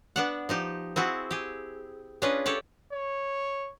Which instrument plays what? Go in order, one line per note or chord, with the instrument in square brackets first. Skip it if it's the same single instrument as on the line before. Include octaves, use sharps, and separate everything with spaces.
[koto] B3 D4 F#5
F3 D#4 G4
C4 E4 F#4 G#4
G4 G#4
C#4 D4 F4 G#4 B4 D#5
G4 A4 C#5 D5
[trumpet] C#5